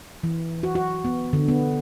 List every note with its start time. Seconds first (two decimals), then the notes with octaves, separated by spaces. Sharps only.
0.23 E3
0.63 F#4
0.75 F#4
1.05 B3
1.33 D3
1.48 B3